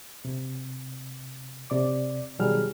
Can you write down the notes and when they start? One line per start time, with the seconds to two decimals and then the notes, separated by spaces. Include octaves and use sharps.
0.25 C3
1.70 C3 D5 D6
2.39 B2 D#3 F#3 G3 G#4 F6